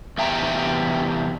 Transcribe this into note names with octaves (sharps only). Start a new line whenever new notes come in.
E2 C3 E5 G5 A5 A#5